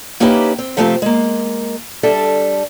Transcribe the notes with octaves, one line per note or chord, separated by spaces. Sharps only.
A#3 C#4 D#4 E4 G4 B4
C4
C3 F3 A3 C4 G4 F5
G#3 A#3
G3 D4 A4 E5